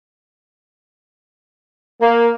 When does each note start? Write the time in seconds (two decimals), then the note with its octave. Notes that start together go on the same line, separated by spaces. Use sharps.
2.01 A#3